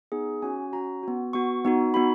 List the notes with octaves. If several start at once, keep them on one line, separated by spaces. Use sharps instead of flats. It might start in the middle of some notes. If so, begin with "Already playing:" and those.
B3 D#4 G#4
C#4 F#4 G#5
C#4 F#4 A#5
B3 F#4
B3 F#4 C#6
B3 D#4 F#4
B3 D#4 F#4 B5